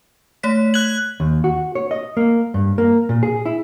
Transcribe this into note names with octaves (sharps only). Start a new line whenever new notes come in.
A3 C#5 B6
F#6 G#6 F#7
D#2
F#4
C#5
D#5
A#3
G2
A#3
A#2
G#4
E4